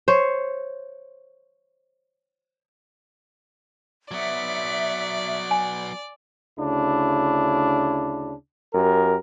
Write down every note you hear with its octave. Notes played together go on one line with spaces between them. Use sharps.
C5 C#5
F#3 B3 D5 E5
G#5
D2 C#3 D4 E4
F#2 G4 A#4